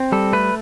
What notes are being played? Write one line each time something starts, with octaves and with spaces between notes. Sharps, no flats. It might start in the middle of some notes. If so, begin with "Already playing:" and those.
Already playing: C4
G3 A4
A3 B4